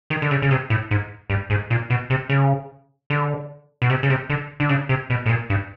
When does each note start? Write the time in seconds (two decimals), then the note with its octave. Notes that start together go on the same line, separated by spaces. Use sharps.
0.10 D#3
0.22 D3
0.31 C#3
0.42 C#3
0.51 C3
0.70 A2
0.91 G#2
1.30 G2
1.50 G#2
1.70 A#2
1.90 B2
2.10 C3
2.30 C#3
3.10 D3
3.82 B2
3.90 C3
4.03 C#3
4.10 C3
4.30 D3
4.60 D3
4.69 C#3
4.89 C3
5.10 B2
5.26 A2
5.29 A#2
5.50 G2